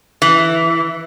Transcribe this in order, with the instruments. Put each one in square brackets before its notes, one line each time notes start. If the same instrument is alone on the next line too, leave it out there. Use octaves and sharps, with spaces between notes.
[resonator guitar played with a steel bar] E3